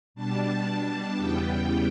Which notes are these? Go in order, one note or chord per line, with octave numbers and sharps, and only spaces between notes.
B2 G3 D4 A5
E2 C#3 E3 G3 B3 G5